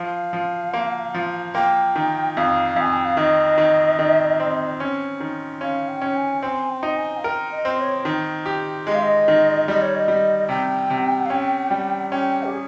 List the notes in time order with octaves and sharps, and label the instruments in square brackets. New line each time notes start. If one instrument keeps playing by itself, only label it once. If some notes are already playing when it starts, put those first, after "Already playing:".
Already playing: [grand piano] F3 [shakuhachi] F5
[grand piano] F3
A#3
F3
[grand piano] A#3 [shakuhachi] G5
[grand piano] D#3
[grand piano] F2 [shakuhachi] F5
[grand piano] F2 [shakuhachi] G#5
[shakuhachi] G5
F5
[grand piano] D#3 [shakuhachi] D#5
[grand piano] D#3
D#3
C4
C#4
D#3
[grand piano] C#4 [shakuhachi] F5
[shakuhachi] G5
[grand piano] C#4
[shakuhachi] G#5
[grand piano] C4 [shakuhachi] G#5
[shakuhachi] G5
[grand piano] D#4
[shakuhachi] G#5
F5
[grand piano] A#4 [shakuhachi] G5
[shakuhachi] D#5
[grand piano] C4
[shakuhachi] C#5
[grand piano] D#3
G4
[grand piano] G#3 [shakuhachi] D#5
[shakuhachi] F5
D#5
[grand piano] D#3
[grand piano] G3 [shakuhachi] D#5
[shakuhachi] C#5
D#5
[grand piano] G3
[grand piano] C3 [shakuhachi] G5
[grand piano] C3
[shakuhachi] F5
[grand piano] C#4 [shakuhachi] G5
[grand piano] G3
[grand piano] C#4 [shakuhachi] G5
[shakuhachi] G4
G#4